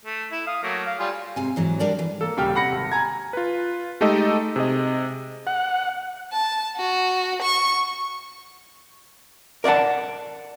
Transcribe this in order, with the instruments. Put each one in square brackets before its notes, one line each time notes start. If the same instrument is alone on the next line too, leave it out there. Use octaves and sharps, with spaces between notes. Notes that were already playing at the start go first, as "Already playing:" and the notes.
[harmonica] A3
E4
F5 D#6
F#3 A3 A#3
F5
G3 F4 G#5
[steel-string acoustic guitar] G#2 C3 G#5
G#2 E3 F#3
G3 D4 A#4 D5 G5
E3
[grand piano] A#3 A4
D#1 C#3 G3 G4 G5 F6
C3 F#5 B5 A#6 C#7
G#1
G#5 A#5 G#6
[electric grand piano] F4 B4
G#3 A3 D#4 G4 A4 D#5
C3 G#4 D#5
[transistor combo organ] F#5
[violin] A5
F#4
C#6
[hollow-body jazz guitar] A#4 D5 F5 F#5 A5